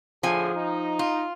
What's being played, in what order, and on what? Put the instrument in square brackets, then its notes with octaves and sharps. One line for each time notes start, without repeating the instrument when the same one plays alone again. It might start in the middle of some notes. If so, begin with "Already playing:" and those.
[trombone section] A2 D3 G#4 [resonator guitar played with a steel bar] F3 G#5
[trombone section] D#4
[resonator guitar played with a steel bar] F4